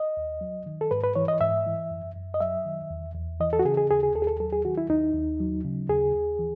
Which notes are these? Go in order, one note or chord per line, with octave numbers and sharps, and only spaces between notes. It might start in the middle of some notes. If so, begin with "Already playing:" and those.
Already playing: D#5
D#2
F#3
D#3
A4
G#2 B4
B4
E3 C#5
D#5
G#2 E5
E3
F#2
F#2
D#5
F#3 E5
D#3
E2
E2
E3 D#5
A4
F#4
C#3 G#4
G#4
D#2 G#4
G#4
D#2 A4
G#4
A4
F#3 A4
G#4
D#3 F#4
E4
D#2 D#4
D#2
F#3
C#3
D#2 G#4
D#2
E3